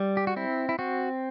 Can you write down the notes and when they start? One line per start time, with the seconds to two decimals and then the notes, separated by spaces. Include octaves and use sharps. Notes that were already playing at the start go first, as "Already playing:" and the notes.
Already playing: G3
0.17 G4
0.27 F#4
0.36 C4 E4
0.69 E4
0.79 C4 F#4